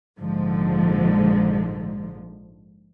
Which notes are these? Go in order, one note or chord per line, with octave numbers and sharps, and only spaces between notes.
A#1 G#2 D3 F3